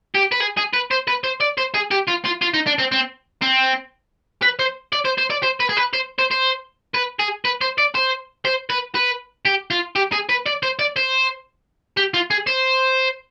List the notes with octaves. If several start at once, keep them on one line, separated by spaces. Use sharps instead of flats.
G4
B4
G#4
G#4
B4
C5
B4
C5
D5
C5
G#4
G4
F4
F4
F4
D#4
D4
C4
C4
C4
B4
C5
D5
C5
C5
D5
C5
B4
G#4
B4
C5
C5
C5
B4
G#4
B4
C5
D5
C5
C5
B4
B4
G4
F4
G4
G#4
B4
D5
C5
D5
C5
G4
F4
G#4
C5